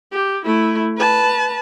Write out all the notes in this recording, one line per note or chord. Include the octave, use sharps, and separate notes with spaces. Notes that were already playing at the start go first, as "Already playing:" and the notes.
G4
A3 E4
B4 A5